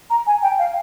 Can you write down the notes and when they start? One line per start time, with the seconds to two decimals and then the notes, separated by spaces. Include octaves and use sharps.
0.10 A#5
0.27 G#5
0.43 G5
0.59 F5